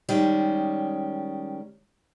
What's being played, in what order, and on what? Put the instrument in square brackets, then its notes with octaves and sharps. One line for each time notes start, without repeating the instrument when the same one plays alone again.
[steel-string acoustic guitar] D#3 G3 G#3 C#4